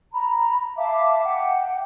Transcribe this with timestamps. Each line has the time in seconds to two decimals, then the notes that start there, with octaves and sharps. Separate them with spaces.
0.12 A#5 B5
0.77 E5 F5 A5 D6
1.24 F#5 G5